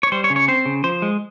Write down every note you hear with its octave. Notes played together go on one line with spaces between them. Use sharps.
C#5
G3 C5
C#5
C#3
C#5
C4 C5
C#3
F3 C5
G#3